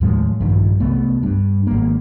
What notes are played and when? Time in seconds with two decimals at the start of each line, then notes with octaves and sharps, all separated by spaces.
0.01 D#2 A2 F3 G#3
0.40 A#1 G2 D#3
0.80 C2 A3 B3
1.23 G2
1.67 G#1 A#3